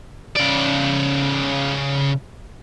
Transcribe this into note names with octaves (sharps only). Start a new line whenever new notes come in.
C#3 D5